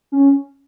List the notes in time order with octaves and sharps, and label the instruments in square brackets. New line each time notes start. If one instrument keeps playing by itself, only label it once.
[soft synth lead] C#4